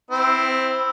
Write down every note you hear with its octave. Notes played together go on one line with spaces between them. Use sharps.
C4 E4